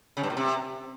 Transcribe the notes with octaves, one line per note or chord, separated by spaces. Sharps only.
C#3
G2
A#2
C3